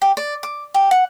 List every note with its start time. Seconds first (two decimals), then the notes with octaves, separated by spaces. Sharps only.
0.02 G4
0.17 D5
0.43 D6
0.74 G4
0.91 F#5